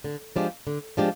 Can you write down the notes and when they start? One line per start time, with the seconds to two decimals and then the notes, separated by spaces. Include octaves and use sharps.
0.04 D3
0.36 F3 G#3 D4 G4
0.67 D3
0.97 F3 G#3 D4 G4